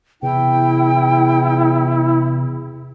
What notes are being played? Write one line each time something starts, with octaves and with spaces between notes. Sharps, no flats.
E2 C3 E4 G5